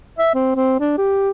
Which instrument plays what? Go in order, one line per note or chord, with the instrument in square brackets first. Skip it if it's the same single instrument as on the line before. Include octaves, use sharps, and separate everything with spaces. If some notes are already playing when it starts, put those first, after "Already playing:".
[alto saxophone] E5
C4
C4
D4
G4